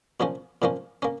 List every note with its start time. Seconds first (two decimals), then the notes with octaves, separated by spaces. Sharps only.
0.20 A#2 F3 A#3 C#4
0.62 A#2 F3 A#3 C#4
1.02 A#3 C#4